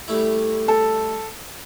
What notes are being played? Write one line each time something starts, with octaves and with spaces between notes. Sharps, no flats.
G3 A3 E4
A4